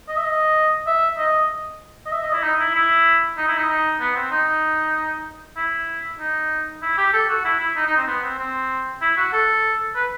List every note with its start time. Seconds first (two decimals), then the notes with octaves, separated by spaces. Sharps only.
0.08 D#5
0.17 E5
0.24 D#5
0.87 E5
1.18 D#5
2.06 D#5
2.12 E5
2.23 D#5
2.33 E4
2.43 D#4
2.59 E4
2.75 E4
3.38 D#4
3.48 E4
3.58 D#4
3.68 D#4
4.00 B3
4.16 C4
4.31 D#4
5.57 E4
6.19 D#4
6.82 E4
6.98 G4
7.13 A4
7.29 F#4
7.45 E4
7.60 E4
7.76 D#4
7.86 D#4
7.97 C4
8.07 B3
8.23 C4
8.39 C4
9.02 E4
9.17 F#4
9.33 A4
9.95 B4